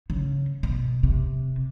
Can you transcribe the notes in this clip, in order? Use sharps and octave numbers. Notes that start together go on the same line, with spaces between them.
C#3
B2
C3